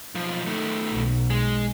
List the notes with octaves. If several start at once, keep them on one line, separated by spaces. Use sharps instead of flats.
B1 F3
D#3 A3
B1
G#3